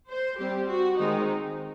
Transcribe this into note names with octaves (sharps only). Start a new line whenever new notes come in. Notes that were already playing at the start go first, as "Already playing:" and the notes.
C5
G3 C4 G4
F#4
D#3 G#3 C4 D#4